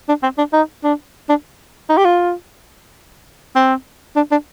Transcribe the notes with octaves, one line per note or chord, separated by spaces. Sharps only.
D4
C4
D4
D#4
D4
D4
D#4
G4
F4
C4
D4
D4